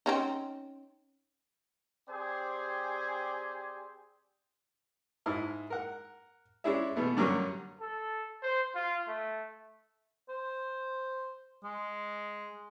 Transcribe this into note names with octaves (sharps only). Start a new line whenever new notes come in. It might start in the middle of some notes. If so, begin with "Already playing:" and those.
C4 C#4 D#4
C4 G4 G#4 C5 D5 G#5
G#2 E4 D#6 F6
A#4 F#5
G#3 C#4 D4 E4 G#4 E5
B2 E3 A3 B3
G2 D3 F#3 C#4 A#4 C#6
A4
C5
F4
A3
C5
G#3